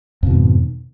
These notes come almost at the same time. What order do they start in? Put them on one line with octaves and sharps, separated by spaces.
F2 B2 D#3 G#2